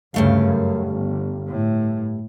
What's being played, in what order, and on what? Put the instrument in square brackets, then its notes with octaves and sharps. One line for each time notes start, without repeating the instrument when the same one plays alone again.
[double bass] D2 C#3 [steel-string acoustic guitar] G2 A3 F5
[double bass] F#2
G1
A2